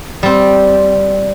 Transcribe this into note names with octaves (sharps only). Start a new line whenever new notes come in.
G3 C4